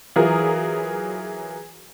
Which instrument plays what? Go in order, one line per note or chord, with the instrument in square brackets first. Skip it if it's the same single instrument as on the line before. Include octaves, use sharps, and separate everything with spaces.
[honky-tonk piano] E3 F#3 F4 G#4 A#4